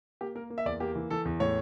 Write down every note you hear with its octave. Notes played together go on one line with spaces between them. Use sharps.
A#3 G4
A#3 A#4
A#3
E5
E2 D5
A#3 G4
E3
E3 A4
E2
A2 C#5